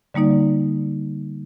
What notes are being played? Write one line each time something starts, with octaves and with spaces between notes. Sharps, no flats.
D3 G3 A#3 D#4 D5